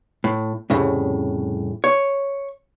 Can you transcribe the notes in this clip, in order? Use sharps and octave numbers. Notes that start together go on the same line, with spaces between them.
A2
C2 F2 A2 C#3
C#5